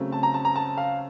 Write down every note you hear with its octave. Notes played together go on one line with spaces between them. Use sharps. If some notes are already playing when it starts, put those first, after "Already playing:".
Already playing: C#3 F#3 A3 C4
A5
A#5
A5
A#5
A5
F5